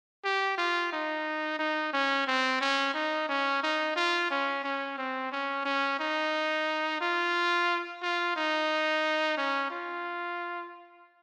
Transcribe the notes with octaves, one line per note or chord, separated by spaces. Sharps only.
G4
F4
D#4
D#4
C#4
C4
C#4
D#4
C#4
D#4
F4
C#4
C#4
C4
C#4
C#4
D#4
F4
F4
D#4
C#4
F4